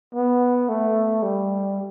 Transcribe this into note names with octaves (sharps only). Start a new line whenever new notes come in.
B3
A3
G3